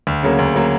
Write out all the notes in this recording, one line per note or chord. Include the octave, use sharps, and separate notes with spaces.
D2
C#3 F#3 A#3
D2
C#3 F#3 A#3